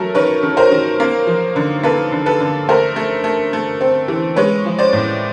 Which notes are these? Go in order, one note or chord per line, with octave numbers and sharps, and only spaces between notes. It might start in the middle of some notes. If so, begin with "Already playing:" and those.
Already playing: F#3 A3 C#4 A4 A#4
D#3 B4 C#5
D#3
A#4 C5
D#3
A#3
F3
D3
A#3 A4 B4
D3
A4 B4
D3
A3 A#4 C5
A3
A3
A3
C4
E3
G#3 B4 C#5
F3
C5 D5
A2